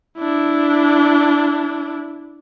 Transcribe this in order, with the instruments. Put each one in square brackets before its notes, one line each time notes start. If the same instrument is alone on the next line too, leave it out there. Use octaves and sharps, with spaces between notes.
[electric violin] D4 E4